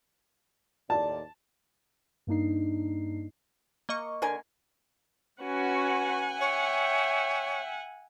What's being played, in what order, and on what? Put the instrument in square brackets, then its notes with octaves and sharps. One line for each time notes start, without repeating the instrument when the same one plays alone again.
[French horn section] D#2 A2 D5 [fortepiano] A5
[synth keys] G2 A#3 D4 D#4 C7
[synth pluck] A#3 D#5 C#6
[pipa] D3 A#4 G#5
[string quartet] C#4 F#4 B4 [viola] F#5 G#5
[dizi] C#5 [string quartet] E5 G5